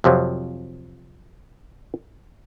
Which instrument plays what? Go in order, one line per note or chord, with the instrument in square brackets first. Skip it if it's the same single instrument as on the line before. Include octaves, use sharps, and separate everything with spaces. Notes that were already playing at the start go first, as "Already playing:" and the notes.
[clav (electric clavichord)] F2 C3 F3 F#3